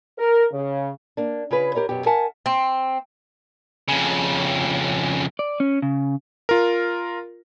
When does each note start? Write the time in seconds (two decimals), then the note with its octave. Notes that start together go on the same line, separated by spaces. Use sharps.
0.18 A#4
0.52 C#3
1.17 A#3 D4
1.51 C#3 F4 G#4 B4
1.75 G4 A#4 C#5 D#5
1.89 F#2 B2 B3 G4
2.06 A#4 E5 F#5 G#5 A5
2.46 C4
3.88 F2 C#3
5.39 D5
5.60 C#4
5.82 C#3
6.49 F4 A#4